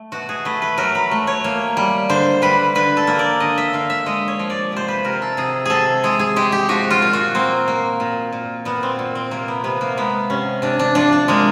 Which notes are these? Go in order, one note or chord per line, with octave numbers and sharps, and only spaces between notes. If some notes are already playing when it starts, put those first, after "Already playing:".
Already playing: A3
B2 F#4
G#4
A3 B4
B4
F#3 A#4
B4
A3
C#5
A#3
G3
D3 C5
G3 B4
D3 B4
A4
A#3
D5
D3 D#5
E5
D3 F5
E5
G#3 D#5
C#5
F3
D5
C3 C5
B4
C3 A#4
A4
C3 G#4
C3 G#4 A4
G#3 G#4
G#4
G#3 G4
G4
F3 F#4
F4
A#2
F#4
A#3 C4
A#3
A#2
A#2
A#2 B3
C4
A#2
C4
C3 A#3
B3
C3 B3
A#3
G#3 B3
C3 C#4
C3 D4
D4
F3 D4
D4
G#3 A#3